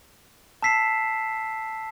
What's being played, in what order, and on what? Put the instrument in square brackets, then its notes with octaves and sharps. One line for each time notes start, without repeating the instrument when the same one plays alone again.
[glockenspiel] A5 E6 B6 C7 E7